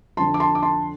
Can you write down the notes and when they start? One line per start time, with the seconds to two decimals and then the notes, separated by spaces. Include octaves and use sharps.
0.17 F2 D3 F3 A5 C6
0.34 D6
0.40 A5 C6
0.55 D6
0.63 A5 C6